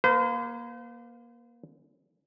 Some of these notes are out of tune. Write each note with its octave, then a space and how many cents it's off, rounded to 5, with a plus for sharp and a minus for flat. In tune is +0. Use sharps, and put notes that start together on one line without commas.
A#3 +20 C5 -45